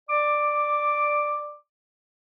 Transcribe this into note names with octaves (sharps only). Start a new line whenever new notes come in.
D5 D6